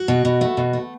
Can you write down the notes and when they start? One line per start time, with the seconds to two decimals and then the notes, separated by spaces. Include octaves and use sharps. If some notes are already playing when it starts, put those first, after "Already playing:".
Already playing: F#4
0.08 B2
0.25 B2
0.41 A3
0.57 B2
0.73 A3